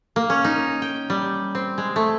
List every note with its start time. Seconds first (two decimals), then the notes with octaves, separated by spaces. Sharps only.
0.16 A#3
0.30 C#4
0.44 D#4
0.82 G5
1.10 G3
1.55 C4
1.78 G#3
1.96 A3